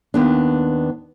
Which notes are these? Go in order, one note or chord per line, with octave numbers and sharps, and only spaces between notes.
D#2 B3 D4